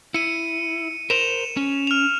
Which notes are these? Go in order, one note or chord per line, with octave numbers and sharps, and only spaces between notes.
E4 C#7 D#7
A#4 C5 E7 F7
C#4
F6 F7